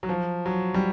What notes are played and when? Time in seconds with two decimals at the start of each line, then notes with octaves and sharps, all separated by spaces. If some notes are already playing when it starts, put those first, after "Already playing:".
0.03 F#3
0.09 F3
0.46 F#3
0.74 G3